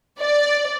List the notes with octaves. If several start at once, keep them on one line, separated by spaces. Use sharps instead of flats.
D5